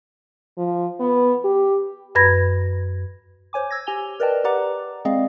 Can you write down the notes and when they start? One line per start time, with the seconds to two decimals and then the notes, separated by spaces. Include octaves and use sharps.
0.58 F3
1.00 B3
1.44 G4
2.15 F#2 B4 B5 G#6 A#6
3.53 C5 C#5 G#5 D6
3.71 E6 G#6 A#6
3.87 G4 G#5 F7 G7
4.20 A#4 B4 D5 D#5 G5 A5
4.44 G4 B4 D5 F#5 A#5 D6
5.05 G#3 C4 G#4 D5 D#5 F5